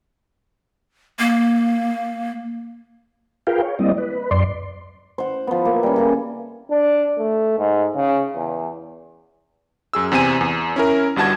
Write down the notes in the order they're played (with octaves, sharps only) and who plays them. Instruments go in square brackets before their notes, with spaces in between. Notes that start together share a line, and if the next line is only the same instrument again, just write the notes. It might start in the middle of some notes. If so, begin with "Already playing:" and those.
[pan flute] A#3
[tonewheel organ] F4 G#4 A#4 B4 F5 G5
C#5
G3 A#3 C4 E4 D5 D#5
B4
F#2 D5 C6
[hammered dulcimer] C5 F#5
F3 B3
A#3 E5
G3 C#4
C#3 A4 A#5
[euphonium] D4
A3
G#2
C#3
E2
[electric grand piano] F#2 G#4 E6
E2 C3 C4 G#5 D#7
E2
C#4 E4 A#4
G1 G2 F#4 A5 G#6